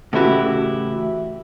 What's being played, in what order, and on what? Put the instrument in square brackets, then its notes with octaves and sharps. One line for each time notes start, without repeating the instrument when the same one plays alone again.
[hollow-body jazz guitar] A2 C#3 E3 E4 F#4 G4